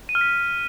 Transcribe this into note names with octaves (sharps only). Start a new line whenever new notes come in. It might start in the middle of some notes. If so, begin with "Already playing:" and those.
D#7
F6
B6